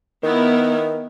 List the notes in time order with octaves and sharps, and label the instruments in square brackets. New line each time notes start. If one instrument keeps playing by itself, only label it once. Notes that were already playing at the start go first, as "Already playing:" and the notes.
[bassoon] D#3 [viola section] B3 E4 A#4